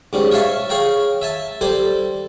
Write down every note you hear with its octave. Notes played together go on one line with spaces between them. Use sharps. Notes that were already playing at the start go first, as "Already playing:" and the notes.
G#2 G3 C#4
C#5 E5 F5 G#5 A5 C#6
G#4 C#5 F5 G5 A#5
E5 G#5 A5
G3 A4 C5 G#5